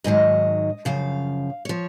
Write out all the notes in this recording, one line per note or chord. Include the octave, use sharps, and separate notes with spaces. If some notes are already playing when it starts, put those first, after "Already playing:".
G#2 D#3 F#3 D#5
F#2 C#3 F3 F5
F3 C#5